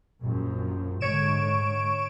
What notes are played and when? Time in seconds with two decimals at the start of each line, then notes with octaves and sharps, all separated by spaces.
0.21 A#1 F#2 F3
1.01 G#2 D3 G#3 C#5 D7 E7